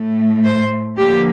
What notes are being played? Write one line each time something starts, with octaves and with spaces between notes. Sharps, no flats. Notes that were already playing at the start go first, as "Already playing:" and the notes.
Already playing: A2 A3
C5
D3 F3 A#3 G4